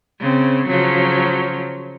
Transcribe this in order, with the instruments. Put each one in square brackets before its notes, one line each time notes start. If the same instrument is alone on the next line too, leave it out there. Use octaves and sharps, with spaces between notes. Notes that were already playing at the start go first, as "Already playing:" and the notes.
[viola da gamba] C#3 C4
C#3 F3 F#3